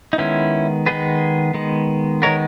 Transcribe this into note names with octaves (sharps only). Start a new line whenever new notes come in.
D#4
D#3 G#3 B3 C#4 E4
D#3 G#3 B3 G#4 B4
D#3 G#3 B3
D#3 G#3 B3 A#4 C#5